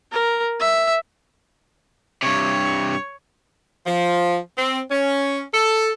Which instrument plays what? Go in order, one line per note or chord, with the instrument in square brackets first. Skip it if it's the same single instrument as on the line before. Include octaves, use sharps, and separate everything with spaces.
[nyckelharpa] A#4
E5
[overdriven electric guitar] G2 C3 [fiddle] C#5
[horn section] F3
C4
C#4
A4